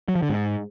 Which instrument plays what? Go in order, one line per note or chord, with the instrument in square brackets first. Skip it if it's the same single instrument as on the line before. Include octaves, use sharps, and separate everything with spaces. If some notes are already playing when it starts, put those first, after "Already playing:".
[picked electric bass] F#3
F3
D3
G#2